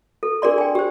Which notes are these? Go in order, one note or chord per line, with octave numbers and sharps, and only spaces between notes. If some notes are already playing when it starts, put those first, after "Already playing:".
A4
D4 G#4 A#4 D5 C6
G5 G#5
G4 C5